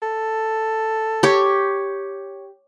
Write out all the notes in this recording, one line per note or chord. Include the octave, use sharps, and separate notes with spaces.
A4
G4 C#5